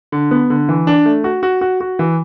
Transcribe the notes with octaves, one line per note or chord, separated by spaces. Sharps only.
D3
B3
D3
E3
D4
A3
F#4
F#4
F#4
F#4
E3